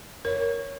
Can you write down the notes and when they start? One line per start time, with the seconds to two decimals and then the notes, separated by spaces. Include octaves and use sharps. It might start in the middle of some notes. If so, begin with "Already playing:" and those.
0.25 A#4 C#5